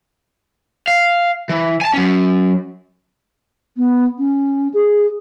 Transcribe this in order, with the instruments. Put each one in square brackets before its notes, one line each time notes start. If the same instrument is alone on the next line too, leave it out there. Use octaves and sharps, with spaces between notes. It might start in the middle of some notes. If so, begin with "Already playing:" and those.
[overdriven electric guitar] F5
E3
G#5 A5
F#3 C#4
[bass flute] B3
C#4
G#4